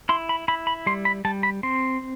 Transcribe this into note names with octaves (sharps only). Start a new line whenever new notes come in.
E4 C6
B5
E4 B5
B5
G3 C6
B5
G3 A5
B5
C4 C6